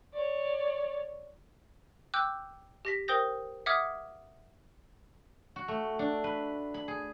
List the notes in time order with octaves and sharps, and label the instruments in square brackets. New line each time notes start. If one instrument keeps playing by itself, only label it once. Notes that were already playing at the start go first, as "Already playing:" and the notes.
[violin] C#5 D5
[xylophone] G5 D6 E6 F#6 G6
G4 A#6 B6
A#4 C5 G5 D#6 G6 A#6
E5 F#5 D6 D#6 F6 G#6
[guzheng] F#4
A3
D4
B4
B5
G#4